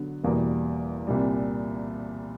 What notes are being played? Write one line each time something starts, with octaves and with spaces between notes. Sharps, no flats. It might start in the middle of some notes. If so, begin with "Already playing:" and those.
Already playing: D3 F#3 B3
E2 B2 G3 A#3
C2 A#2 G3